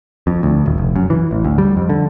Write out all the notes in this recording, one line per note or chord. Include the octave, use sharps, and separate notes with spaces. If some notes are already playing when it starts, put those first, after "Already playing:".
F2
D2
D#1
F1
F#2
E3
A1
D2
G3
F2
D3